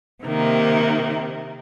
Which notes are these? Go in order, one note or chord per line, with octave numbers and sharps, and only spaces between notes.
C3 D#3 A#3